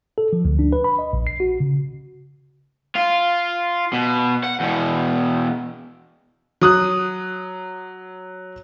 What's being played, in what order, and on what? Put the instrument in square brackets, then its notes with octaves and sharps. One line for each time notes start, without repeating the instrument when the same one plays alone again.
[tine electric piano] A4
F3
D2
D4
B4
B5
D#5
A#1
C7
F#4
C#3
[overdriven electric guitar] F4
B2
F#5
E2 B2
[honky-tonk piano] F#3 D#6 F#6